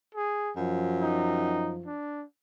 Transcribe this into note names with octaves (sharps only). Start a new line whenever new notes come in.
G#4
F#2 F3
D#4
D4